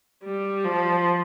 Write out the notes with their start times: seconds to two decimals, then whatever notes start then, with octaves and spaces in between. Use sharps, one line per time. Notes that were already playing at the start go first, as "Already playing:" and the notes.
0.24 G3
0.64 F3